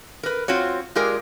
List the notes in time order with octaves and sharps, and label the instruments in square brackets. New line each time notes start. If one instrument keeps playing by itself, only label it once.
[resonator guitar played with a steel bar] A#4 B4
C4 F4 F#4 C#5
G#3 F4 G4 G#4 A#4 D5